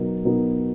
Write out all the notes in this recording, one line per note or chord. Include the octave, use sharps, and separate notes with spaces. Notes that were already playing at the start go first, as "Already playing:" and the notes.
Already playing: B2 F#3 B3 D#4 A#4
B2 F#3 B3 D#4 A#4